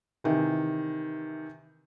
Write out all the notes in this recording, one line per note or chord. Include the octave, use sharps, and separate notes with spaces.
C3 D#3 E3